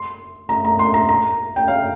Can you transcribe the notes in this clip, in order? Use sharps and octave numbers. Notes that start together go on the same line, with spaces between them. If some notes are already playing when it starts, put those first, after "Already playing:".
Already playing: C6
A#5
A#5
C6
A#5
A#5
G5
F5